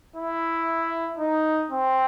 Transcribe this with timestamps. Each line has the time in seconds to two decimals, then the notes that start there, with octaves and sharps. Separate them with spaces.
0.16 E4
1.18 D#4
1.71 C4